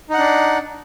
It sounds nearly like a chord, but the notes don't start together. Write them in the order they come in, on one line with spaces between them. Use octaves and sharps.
D#4 F#5 D4